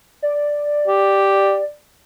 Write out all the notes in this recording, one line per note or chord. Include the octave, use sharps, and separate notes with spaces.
D5
G4